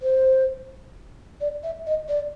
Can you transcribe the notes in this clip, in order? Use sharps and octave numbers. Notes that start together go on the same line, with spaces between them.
C5
D5
E5
D#5
D5